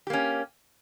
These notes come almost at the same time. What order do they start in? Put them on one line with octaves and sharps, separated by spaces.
G4 A#3 C#4